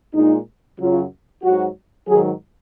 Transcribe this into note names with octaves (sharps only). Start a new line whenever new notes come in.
A#2 G#3 D#4
F#2 C#3 F#3 F4
G#2 F#3 F#4
G#2 D#3 F#3 G#4